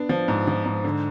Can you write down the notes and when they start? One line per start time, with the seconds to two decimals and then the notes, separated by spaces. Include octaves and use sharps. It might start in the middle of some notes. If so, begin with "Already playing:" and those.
Already playing: B3 D4 D5
0.09 F3
0.28 G#2
0.48 F3
0.66 G#2
0.84 D3